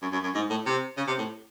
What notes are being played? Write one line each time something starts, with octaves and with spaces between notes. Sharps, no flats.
F#2
F#2
F#2
G#2
A2
C3
C#3
C3
A2